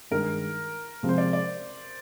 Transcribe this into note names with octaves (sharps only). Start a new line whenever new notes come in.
G2 D#3 G#3 A#4
C3 F3 G#3 C4
C5
D5
D5